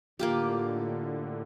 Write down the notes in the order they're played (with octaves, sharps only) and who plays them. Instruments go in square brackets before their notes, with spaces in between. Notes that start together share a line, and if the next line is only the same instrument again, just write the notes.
[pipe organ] A2 D3 [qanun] A#3 F4 G4